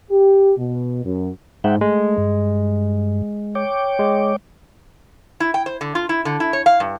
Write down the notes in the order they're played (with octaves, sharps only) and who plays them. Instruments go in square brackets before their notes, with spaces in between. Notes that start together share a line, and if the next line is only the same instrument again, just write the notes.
[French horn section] G4
B2
F#2
[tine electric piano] G#2 [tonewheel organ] E5 F#5 G5
[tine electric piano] G#3 [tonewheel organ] A3
[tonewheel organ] G2
C#5 G5 D6
[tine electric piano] G#3
[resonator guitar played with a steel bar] E4
G5
C5
D3
F4
E4
D3
E4
C#5
F5
G2